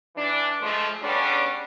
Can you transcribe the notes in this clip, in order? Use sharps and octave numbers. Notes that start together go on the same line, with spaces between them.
E3 D4
F3 G#3 A3
G2 C#3 G3 B3 C#4 D4